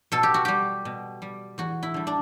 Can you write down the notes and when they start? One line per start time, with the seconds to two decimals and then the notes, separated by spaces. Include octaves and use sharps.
0.12 B2 A4
0.23 G4
0.34 F#4
0.45 G3 G4
0.85 B2
1.22 G3
1.58 E2 F#4
1.83 E4
1.94 D3 G3
2.07 D4